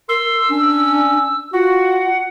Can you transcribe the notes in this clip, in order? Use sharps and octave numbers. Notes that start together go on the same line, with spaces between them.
A#4 C6 E6
C#4 D4
F4 F#4 F#5